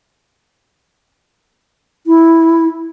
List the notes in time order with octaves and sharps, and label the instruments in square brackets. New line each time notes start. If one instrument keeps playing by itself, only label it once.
[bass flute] E4